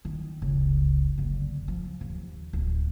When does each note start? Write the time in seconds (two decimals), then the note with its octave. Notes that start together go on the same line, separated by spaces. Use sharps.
0.05 D#3
0.42 F1 C#2
1.18 F#1 D3
1.68 F3
2.01 D#2
2.53 D1